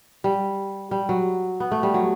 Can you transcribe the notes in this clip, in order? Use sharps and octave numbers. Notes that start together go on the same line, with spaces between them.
G3
G3
F#3
B3
A3
G3
F#3